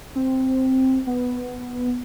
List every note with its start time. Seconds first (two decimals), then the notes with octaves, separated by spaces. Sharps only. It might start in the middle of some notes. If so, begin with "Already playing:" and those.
0.15 C4
1.07 B3